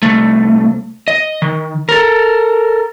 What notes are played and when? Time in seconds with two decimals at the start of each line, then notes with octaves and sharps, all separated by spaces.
0.03 C2 A3
1.08 D#5
1.42 D#3
1.89 A4 A#4